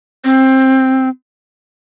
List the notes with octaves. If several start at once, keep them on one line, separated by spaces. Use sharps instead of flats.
C4